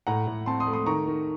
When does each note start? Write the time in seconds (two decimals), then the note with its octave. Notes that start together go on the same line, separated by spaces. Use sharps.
0.07 A2 F#5 A#5
0.27 A2
0.46 C4 A5 C6
0.60 C6 D#6
0.67 A3
0.73 C6 D#6
0.86 D#3 A#5 C#6
1.07 D#3